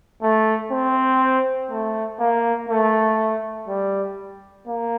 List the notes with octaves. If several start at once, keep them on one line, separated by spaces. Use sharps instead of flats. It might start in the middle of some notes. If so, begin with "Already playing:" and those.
A3
C4
A3
A#3
A3
G3
A#3